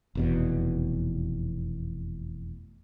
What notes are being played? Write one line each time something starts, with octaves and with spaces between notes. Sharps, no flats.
F1 E2 B2